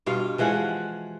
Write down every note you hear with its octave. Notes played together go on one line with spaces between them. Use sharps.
G2 B2 F4 F5
E3 F3 G#3 F#5